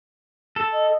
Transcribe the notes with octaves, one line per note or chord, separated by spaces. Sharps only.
A4
D#5